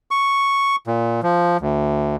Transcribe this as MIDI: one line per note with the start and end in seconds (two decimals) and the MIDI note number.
0.11 0.76 85
0.87 1.21 46
1.23 1.57 53
1.61 2.16 38